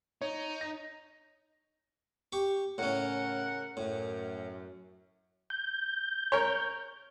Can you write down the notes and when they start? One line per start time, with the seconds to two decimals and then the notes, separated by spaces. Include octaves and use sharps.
0.22 D#4 C#5
0.61 A#6
2.32 G4 C#6
2.78 A2 C#3 C#4 A#4 F#5
3.77 F#2 A2
5.50 G6
6.32 A#4 C#5